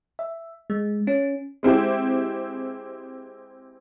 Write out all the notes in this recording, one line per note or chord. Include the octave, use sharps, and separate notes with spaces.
E5
G#3
C#4
G#3 C4 E4 G4